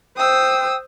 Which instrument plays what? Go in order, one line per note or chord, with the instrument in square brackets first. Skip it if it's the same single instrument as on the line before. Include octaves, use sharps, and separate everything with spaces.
[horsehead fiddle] C5 [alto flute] G5 [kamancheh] D#6 E6